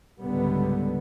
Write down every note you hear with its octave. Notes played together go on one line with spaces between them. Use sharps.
C#2 G#2 D3 G3 B3